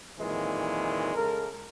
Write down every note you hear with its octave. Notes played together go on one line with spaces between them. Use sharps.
F2 A#2 D#3 E3 F#3 G#3
C#3 G#3 A4 A#4